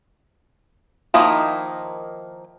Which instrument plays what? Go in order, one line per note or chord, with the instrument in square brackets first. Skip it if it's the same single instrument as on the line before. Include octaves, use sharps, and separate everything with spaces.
[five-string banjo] D#3 F3 A#3 D#4 E4